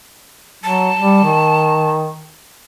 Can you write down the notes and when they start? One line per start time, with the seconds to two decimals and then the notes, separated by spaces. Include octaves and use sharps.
0.64 F#3 A5
0.97 G3
1.24 D#3